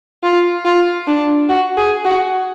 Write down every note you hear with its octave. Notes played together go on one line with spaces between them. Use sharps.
F4
F4
D4
F#4
G#4
F#4